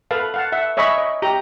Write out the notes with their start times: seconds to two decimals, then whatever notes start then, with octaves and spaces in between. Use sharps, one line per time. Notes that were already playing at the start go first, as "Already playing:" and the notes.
0.11 A4 B4 F5 A5
0.34 F5 F#5 A5
0.52 E5 F#5
0.77 C#5 D#5 E5 G#5 B5 C#6
0.98 D#5
1.22 G4 A#5